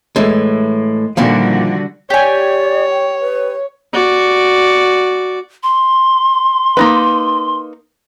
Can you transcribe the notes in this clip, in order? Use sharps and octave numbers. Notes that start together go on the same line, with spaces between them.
A2 E3 G#3
A#2 D3 D#3 F3 G3 A#3 E4 F#4
G4 C#5 D5 G#5
G5
B4
F#4 D5
C6
A#3 D#4 B4